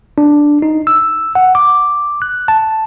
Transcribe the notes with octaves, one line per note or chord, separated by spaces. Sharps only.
D4
D#4
E6
F#5
D6
F#6
A5